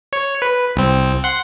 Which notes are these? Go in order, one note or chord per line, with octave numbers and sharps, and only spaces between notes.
C#5
B4
C2 C4
F#5 C6